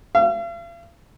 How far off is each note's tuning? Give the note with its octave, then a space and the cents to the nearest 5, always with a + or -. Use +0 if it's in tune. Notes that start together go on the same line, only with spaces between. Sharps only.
F5 -45